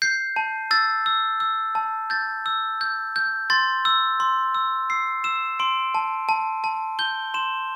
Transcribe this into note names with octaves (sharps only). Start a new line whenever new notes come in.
G6 C7
A5
E6 A6
E6
E6
A5
G6 A6
E6
G6
G6
C6 A6
E6
C6
E6
E6 C7
E6 E7
C6 D7
A5
A5
A5
G6 G7
C6 E7